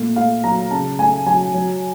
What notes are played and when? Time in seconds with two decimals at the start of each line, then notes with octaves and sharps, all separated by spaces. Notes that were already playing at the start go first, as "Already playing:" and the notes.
Already playing: A#2 A3
0.16 A3 F5
0.43 F#3 A#5
0.71 C#3 A5
0.99 A3 G#5
1.26 F#3 G#5
1.54 F#3